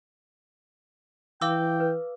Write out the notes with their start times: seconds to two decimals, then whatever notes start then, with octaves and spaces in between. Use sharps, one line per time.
1.42 E3 F5 G5 D6 E6
1.80 B4